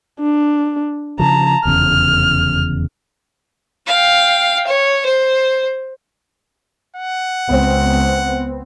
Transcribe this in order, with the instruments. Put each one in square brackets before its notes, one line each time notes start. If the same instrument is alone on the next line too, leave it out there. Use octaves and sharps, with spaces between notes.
[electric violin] D4
[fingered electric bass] C#3 F3 [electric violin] A5 A#5
[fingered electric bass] F1 E2 C#3 [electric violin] F6
[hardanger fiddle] F5 G5
C#5
C5
[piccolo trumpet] F#5
[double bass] C#2 [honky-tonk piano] B3 C4